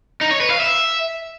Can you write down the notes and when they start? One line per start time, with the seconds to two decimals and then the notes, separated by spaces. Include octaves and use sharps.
0.21 D#4
0.31 C#5
0.41 B4
0.50 F5
0.60 E5